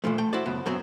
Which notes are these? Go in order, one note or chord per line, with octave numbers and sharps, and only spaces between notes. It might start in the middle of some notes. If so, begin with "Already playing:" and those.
A#2 E3 F3 A3
A3 G5
E4 F#4 C5 D5
C#2 F#2 B3
F#2 F#3 B3 C4